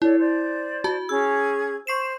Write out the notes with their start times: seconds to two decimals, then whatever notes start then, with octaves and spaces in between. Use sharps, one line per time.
0.02 E4 A4 C#5 D5
0.20 C5 D5
0.84 F#4 A5
1.09 C#4 G#4 E6 G#6
1.87 C5 C#6 C7 E7